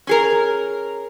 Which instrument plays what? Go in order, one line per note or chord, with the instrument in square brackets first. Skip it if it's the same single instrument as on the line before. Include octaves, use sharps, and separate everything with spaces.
[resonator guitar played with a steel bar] C#4 G#4 A#4